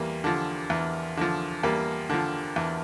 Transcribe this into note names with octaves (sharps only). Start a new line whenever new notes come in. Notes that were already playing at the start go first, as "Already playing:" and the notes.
Already playing: E2 G3 A#3
D3 F3
E2
D3 F3
E2 G3 A#3
D3 F3
E2